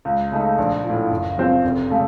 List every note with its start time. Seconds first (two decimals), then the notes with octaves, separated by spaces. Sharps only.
0.05 C#2
0.31 C#3 A3 D#4
0.58 A#1
0.84 F3
0.89 A2
1.11 F#1
1.37 F#2 F3 C4
1.64 F1
1.90 C#3 A3